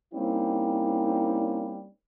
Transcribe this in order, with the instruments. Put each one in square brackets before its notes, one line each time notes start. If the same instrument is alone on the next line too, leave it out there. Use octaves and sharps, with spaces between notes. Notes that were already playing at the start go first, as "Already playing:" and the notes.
[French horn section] G3 A#3 C4 C#4 D#4 E4